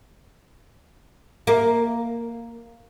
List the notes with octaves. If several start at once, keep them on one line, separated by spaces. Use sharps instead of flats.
A#3